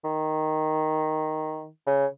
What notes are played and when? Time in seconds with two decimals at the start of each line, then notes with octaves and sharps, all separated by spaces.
0.04 D#3
1.87 C#3